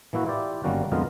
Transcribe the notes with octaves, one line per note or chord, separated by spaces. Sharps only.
E3 A#3 E4 F#4
E4 F4 G4 D5
G1 D#3 G3 A#3 C#4 F#4
F2 D3 G#3 B3 F4 A#4